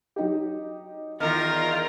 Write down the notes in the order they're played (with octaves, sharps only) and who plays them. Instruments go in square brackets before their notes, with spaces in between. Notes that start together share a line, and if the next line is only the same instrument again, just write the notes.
[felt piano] F#3 D#4 G4
[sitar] E2 D#3 [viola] F4 A#4 [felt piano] F6